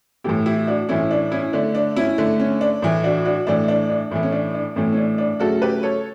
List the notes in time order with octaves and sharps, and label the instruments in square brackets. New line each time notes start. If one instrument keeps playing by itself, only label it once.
[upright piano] A2 E3 A3 E4 G4
E4 G4
D4 F#4
A2 E3 A3 C#4 E4
D4
C#4 E4
D3 A3 D4
D4
C#4 E4
D3 A3
C#4
D4
A2 E3 A3
D4 F#4
D4 F#4
A2 E3 A3 D4
D4
D4
A2 E3 A3
C#4
D4
D4
A2 E3 A3 C#4
C#4
D4
D4
C#3 F#3 A3 F#4 A4
G4 B4
A4 C#5